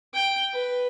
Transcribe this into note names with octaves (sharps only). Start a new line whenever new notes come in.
G5
B4